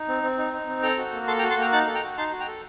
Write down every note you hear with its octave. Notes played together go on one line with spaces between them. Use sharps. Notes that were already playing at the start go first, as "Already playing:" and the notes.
Already playing: D#4
C4
C4
D#4
D#4
C4
A4 G5 A#5
F#4
A#3
A4 A5 C6
G5 A#5
F#4
A5 C6
A#3 G5 A#5
D#4 F#5 A5
A4
G5 A#5
F#4
D#4 A5 C6
F#4
G5 A#5
A4